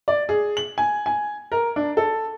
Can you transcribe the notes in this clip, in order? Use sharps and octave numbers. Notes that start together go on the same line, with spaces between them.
D5
G#4
F#7
G#5
G#5
A#4
D4
A4